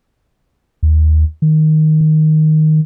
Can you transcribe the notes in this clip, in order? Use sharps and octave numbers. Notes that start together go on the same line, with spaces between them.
D#2
D#3
D#3